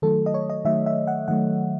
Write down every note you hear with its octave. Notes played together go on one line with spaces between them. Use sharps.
D#3 F#3 A3 A4
D#5
C#5
D#5
D#3 F#3 A3 E5
E5
F#5
D#3 F#3 A3 F#5